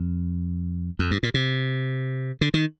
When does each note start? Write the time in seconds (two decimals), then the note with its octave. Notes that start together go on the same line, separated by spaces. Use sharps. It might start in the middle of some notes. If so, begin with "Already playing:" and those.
Already playing: F2
0.99 F2
1.11 G2
1.23 A#2
1.34 C3
2.41 D3
2.54 D#3